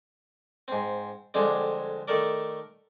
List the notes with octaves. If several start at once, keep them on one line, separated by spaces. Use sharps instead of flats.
G#2 C4
F2 D3 G3 G#3 C4
D#3 A3 A4 A#4 D5